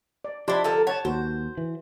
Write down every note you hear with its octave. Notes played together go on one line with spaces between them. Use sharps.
D5
F3 D4 E4 G4 C6 D6
D3 A4 A#4
C#5 F#5 A5
D#2 F#4 C5
E3